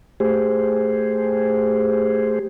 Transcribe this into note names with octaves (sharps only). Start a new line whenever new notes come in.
A3 G4 G#4 C5